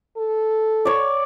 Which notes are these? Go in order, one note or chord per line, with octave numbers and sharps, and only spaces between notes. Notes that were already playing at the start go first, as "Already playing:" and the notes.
A4
C#5 D5